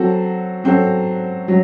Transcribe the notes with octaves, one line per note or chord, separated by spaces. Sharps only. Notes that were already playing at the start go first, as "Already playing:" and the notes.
Already playing: F#3 C4 F#4 A4
F#3 C4 F#4 A4
F#3